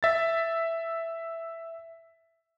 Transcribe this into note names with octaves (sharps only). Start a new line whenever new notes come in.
E5 A6